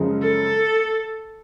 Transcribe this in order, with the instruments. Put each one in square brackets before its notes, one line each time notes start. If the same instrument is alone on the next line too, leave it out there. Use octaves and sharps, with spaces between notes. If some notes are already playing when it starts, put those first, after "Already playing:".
Already playing: [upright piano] F#2 C#3 F3 G#3
[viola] A4